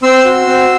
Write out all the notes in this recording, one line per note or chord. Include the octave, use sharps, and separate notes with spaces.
C4 C6 E6
F#4
C4